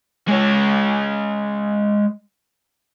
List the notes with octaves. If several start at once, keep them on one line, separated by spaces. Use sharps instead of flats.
G#3 C#5